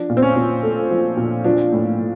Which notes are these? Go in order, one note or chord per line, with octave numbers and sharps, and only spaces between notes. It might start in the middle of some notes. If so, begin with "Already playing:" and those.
Already playing: F3 D4
A#2
C4
C#4
A#2
A3
F3
A#2
F3 D4
A2
A2